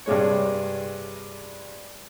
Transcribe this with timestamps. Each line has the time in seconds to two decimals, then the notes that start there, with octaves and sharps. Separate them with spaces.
0.06 G2 C3 G#3 C#5